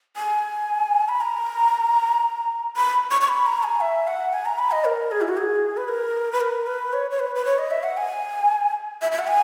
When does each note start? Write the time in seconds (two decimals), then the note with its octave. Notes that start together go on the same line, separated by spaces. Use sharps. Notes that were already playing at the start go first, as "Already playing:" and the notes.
0.16 G#5
1.09 B5
1.21 A#5
2.77 B5
3.11 C#6
3.21 C#6
3.29 B5
3.46 A#5
3.63 G#5
3.81 E5
4.07 F#5
4.33 G#5
4.45 A#5
4.58 B5
4.71 D#5
4.85 A#4
5.11 G#4
5.21 E4
5.29 F#4
5.37 G#4
5.77 B4
5.88 A#4
6.32 B4
6.41 A#4
6.67 B4
6.93 C#5
7.11 C#5
7.20 B4
7.35 B4
7.45 C#5
7.59 D#5
7.71 E5
7.83 F#5
7.97 G#5
9.02 E5
9.12 E5
9.19 F#5
9.27 G#5